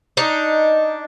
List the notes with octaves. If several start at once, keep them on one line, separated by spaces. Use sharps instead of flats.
D4 D#4 D#5